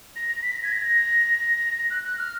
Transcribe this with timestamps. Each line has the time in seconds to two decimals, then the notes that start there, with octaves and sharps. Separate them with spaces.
0.16 A#6
0.29 A#6
0.43 B6
0.56 A#6
0.64 G#6
0.72 A#6
1.90 F#6
2.04 F#6
2.18 F6